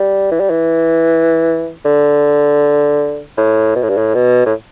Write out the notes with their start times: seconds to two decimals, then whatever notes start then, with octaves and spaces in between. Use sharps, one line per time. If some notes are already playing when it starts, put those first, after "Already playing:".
Already playing: G3
0.31 E3
0.40 G3
0.50 E3
1.85 D3
3.37 A2
3.76 B2
3.83 A2
3.90 G2
3.98 A2
4.15 B2
4.46 A2